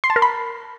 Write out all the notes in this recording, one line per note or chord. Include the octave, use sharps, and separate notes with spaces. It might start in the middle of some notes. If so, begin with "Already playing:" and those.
C6
A5
A#4
B5